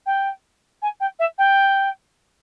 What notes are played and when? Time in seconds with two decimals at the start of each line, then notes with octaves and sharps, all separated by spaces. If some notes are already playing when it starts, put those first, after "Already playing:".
0.06 G5
0.82 G#5
1.00 G5
1.19 E5
1.38 G5